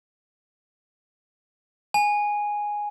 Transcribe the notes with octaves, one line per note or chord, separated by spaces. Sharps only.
G#5